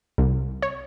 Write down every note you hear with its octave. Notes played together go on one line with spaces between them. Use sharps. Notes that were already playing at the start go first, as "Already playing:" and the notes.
C2
C#5